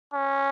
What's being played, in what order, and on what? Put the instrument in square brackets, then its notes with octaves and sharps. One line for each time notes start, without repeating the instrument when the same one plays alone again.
[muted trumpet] C#4